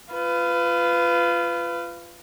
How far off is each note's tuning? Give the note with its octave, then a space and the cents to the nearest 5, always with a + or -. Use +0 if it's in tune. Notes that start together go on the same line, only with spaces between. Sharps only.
F4 -15 B4 +20